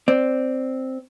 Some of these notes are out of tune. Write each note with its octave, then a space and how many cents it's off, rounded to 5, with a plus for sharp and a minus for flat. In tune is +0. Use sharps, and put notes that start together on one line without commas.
C4 +0 D5 +0